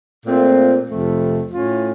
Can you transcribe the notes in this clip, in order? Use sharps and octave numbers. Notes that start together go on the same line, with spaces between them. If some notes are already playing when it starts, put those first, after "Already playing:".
A#2 A3 C4 F4
F2 C3 F3 A3 C4
A2 A3 C#4 F4